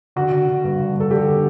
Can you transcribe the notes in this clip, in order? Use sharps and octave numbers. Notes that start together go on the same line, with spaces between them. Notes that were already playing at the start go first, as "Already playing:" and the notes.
D3 F#4
D3
D3
G2
D3
G2 A4
D3 G4